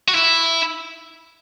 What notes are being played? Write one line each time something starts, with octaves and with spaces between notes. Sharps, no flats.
F#4
E4